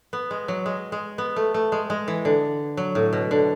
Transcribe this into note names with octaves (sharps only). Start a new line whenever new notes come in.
B3
G#3
F#3
G#3
G#3
B3
A3
A3
G#3
G#3
E3
D3
F#3
A2
B2
D3